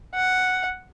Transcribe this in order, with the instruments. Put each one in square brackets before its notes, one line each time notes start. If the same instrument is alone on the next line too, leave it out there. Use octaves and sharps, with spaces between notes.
[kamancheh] F#5